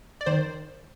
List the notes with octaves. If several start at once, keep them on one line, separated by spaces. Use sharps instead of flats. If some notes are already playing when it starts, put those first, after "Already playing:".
D5
D#3 C5